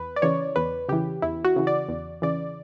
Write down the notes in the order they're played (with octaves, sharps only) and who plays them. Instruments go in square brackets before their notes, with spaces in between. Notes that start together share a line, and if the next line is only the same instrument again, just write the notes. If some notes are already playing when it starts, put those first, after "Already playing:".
Already playing: [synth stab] E2 B4
D5
C#3 E3 C#5
E2 B4
C#3 E3 G4
E2 E4
F#4
C#3 E3
D5
E2
C#3 E3 D5